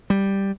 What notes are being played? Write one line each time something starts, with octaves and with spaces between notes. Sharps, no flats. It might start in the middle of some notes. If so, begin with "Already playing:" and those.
G3